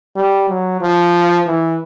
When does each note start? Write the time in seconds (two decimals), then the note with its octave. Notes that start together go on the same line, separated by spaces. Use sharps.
0.16 G3
0.49 F#3
0.81 F3
1.47 E3